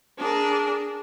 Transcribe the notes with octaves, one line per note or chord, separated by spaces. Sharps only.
D4 G#4 A#4